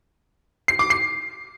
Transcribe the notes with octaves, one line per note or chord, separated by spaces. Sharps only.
C7
D6
C7